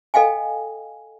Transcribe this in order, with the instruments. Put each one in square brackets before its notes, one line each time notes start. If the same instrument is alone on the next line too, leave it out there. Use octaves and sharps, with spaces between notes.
[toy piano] A4 D#5 F5 G5 G#5